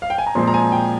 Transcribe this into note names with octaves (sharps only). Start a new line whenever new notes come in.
F5
G5
G#5
A#5
A#2 F3 G#3 C4 C6
A#5
G#5
G5